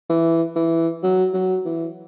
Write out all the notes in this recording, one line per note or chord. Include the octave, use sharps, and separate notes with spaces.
E3
E3
F#3
F#3
E3